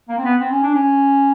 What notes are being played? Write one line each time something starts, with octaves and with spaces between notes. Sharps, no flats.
A#3
C4
B3
C4
C#4
D4
C#4